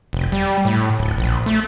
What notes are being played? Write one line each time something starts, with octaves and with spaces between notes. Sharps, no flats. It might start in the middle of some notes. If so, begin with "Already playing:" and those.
F1
G3
A2
D1
A#1
A3